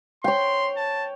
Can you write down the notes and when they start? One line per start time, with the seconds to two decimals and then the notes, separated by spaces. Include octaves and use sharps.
0.24 C#5 G5 C6
0.77 A5